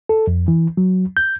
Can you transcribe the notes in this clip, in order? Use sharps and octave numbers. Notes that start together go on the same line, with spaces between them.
A4
F2
E3
F#3
G6